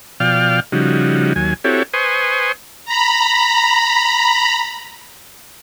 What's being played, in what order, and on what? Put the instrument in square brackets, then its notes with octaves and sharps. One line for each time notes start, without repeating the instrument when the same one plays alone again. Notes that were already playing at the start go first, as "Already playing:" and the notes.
[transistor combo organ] B2 F3 D5 F5 G5 F6
C#3 F3 G3 D#4 F#4
D#2 F#3 G#5
C4 E4 F#4 G4 A4 C#5
B4 C5 G#5 C6 C#6 D#6
[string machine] A#5 B5